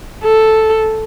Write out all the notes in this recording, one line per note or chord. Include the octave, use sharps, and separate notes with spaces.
A4